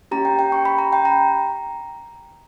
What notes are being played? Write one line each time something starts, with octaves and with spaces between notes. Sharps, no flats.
A#3 C#4 G4 A#5
G5
G5
C#6
B5
A#5
G5
A#5